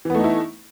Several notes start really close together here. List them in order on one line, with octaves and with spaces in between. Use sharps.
E3 B3 A3 D#4 E4